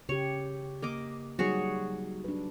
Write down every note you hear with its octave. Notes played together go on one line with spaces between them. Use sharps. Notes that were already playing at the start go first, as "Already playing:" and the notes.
C#3 G4 C#5
A#3 D#5 D6
F#3 G3 D#4 F#4 G#4 C#5
D4 B4